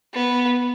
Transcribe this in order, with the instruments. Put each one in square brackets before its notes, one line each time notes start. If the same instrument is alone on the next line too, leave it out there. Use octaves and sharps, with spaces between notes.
[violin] B3